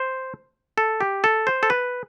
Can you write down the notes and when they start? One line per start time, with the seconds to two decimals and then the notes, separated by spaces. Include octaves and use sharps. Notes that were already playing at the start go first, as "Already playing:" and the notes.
Already playing: C5
0.78 A4
1.01 G4
1.24 A4
1.47 C5
1.63 A4
1.70 B4